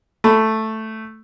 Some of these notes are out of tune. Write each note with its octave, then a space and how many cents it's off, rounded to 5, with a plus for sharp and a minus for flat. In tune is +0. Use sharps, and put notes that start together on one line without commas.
A3 +0 B5 +30